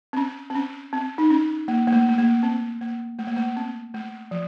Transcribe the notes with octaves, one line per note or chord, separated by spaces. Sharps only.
C4
C#4
C4
C#4
C4
D#4
C#4
A#3
A#3
A3
A3
A#3
C4
A#3
A3
A#3
A3
C4
A3
F3